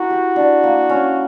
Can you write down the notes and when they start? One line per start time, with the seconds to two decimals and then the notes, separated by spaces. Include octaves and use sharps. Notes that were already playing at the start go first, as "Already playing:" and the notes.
Already playing: E4 F#4 A#4
0.10 G4
0.36 D4
0.64 A#3
0.89 C#4